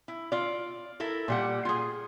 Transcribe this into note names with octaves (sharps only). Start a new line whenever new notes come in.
E4
F4 D5
E4 A4 A#4
A#2 G3 F#5
F4 G#4